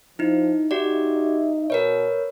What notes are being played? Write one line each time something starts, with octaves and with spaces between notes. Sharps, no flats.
F3 D#4 E4
D#4 F#4 G4 D5 E5
B2 A#4 B4 C#5